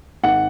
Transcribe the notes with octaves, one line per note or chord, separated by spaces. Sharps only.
G#1 F#5